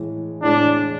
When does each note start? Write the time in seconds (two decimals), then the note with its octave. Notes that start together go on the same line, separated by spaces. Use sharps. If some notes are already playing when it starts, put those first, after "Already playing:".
Already playing: A2 E3 G#3
0.43 A2 E3 G#3 D4